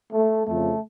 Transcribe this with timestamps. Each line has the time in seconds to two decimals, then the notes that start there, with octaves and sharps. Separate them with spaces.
0.12 A3
0.47 F2 C#3 F3 A3